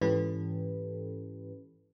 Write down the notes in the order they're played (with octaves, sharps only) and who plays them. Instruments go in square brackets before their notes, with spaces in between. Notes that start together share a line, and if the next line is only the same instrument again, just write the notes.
[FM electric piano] G#2 E3 C#4 G4 A4 B4